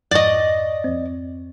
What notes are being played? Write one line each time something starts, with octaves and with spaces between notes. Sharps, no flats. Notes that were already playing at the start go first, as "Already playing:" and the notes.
F2 G#2 D5 D#5 C#6
F2 C4